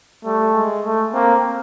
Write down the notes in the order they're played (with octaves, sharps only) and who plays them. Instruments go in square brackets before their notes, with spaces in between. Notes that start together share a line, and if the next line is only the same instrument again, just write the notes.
[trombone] G3 [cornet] A3
[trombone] G#3
[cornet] A3
[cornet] A#3 [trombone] C4